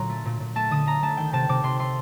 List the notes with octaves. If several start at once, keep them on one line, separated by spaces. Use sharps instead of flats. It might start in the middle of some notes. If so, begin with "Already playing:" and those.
Already playing: A#2 D3 F#3 A#5 C6
A3
A#2
A#2
A3 A5
D3 D#6
A3 A#5
A3 A5
D#3 G5
C3 A5
C3 D6
C3 C6
A3 C6